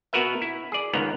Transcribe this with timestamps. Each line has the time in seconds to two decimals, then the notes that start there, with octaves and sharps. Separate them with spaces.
0.13 B2 B3 F#4 A#4 B4 E5
0.42 E4
0.72 G#4 D5
0.93 C#2 G#2 D#3 B3 A#5